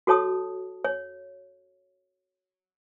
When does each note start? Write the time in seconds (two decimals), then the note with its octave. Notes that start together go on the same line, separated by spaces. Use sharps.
0.07 F#4 A4 C#5 A5 D#6
0.85 C#5